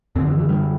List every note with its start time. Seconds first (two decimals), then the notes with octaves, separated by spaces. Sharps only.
0.16 F#2 D3 C4
0.28 E3
0.38 E3
0.49 G3